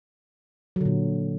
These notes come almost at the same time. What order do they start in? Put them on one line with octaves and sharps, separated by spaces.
F#3 D3 A#2